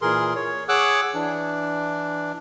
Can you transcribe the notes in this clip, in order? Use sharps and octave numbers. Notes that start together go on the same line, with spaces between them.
A#2 E3 G#4 A#4 C6
C#5
G#4 C#5 F#5 D6 E6 F#6
E3 D4